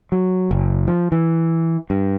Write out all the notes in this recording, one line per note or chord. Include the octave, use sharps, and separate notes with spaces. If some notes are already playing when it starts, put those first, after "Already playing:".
F#3
F#1
F3
E3
G2